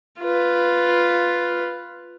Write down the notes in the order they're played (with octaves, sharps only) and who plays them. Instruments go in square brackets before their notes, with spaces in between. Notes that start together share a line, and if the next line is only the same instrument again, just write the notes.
[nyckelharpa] F4 B4